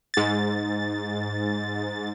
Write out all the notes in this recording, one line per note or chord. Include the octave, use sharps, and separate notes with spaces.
G#2 A6